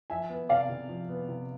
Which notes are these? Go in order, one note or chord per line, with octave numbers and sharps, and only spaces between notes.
F3 E5 G#5
B3
C3 D5 F5
C3
F3
B3
C3